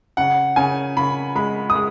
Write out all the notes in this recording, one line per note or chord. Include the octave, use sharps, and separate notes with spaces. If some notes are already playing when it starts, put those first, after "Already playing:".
C#3 F#5
C#3 G#5
C#3 B5
G#3 B5
D#6
G#3